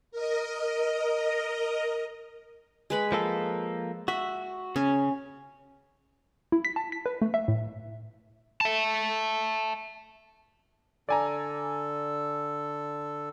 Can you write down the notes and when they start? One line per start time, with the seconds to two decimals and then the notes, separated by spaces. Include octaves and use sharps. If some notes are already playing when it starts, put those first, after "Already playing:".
0.11 A#4 D#5
2.90 G#3 B4 B5
3.12 F3 A#3 A4
4.08 F#4 E5
4.76 C#3 C#4
6.52 E4
6.65 B6
6.76 A5
6.92 B6
7.06 B4
7.22 A3
7.34 E5
7.48 A2
8.61 E5 A5
11.09 D3 A4 D5 G#5 A#5